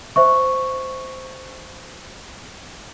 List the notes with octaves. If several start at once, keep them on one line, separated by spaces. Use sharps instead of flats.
C5 E5 C#6